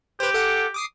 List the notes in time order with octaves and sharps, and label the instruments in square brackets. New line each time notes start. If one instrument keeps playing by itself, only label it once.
[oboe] G4 [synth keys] B4 C5
[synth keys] A4 F#5 D6
D6 D#6 C7